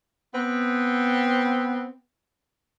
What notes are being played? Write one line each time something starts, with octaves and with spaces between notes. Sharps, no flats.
B3 C4